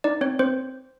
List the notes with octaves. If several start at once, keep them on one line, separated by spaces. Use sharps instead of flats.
D#4 D5
C4 C#5
C4 C5